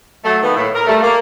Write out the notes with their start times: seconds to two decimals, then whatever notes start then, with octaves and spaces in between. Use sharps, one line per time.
0.24 F#3 A3
0.42 D#3 A#3 B3
0.56 A2 E4
0.74 A#4
0.87 G3 A3
1.02 A#3